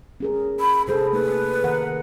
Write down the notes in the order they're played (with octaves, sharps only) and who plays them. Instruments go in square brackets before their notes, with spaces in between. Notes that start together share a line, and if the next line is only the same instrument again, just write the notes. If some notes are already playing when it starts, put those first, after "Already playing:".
[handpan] C#4 G#4 A#4
[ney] B5
[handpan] C3 G#4 A4 [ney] C5
[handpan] A3 A#3 D#4 [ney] B4
[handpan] D#3 A#4 F#5